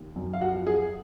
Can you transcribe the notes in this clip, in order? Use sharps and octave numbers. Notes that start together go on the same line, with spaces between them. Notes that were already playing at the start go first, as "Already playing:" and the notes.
Already playing: D#2
F#2
F5
F#4 F#5
F3
G#4 G#5